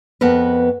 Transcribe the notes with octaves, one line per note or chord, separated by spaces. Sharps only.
F2 B3 A#4 B4